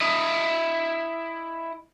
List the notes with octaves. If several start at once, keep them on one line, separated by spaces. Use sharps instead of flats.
E4 D#5